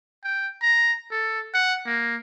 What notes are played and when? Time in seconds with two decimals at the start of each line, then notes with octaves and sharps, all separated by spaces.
0.24 G5
0.63 A#5
1.11 A4
1.54 F#5
1.87 A#3